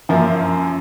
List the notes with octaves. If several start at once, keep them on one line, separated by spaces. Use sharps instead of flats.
F#2 F3 A#3 E4